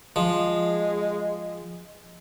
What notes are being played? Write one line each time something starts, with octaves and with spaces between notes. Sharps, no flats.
F3 G#3